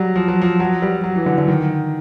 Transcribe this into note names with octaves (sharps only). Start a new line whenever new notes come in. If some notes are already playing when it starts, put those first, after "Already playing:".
Already playing: F#3 G3
F3
F#3
F3
F#3
G3
F#3
E3
D3
D3
D#3